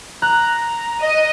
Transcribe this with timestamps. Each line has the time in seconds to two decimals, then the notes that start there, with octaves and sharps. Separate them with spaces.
0.22 A#5 F#6
1.02 D#5